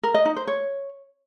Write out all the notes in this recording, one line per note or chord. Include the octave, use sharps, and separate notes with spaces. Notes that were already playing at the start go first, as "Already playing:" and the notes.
A#4
D#5
D#4
C5
C#5